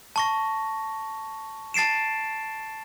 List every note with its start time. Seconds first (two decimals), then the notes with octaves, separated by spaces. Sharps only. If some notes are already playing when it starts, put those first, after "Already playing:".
0.16 A5 C#6 A#6
1.74 A5 A6 C7 D7 E7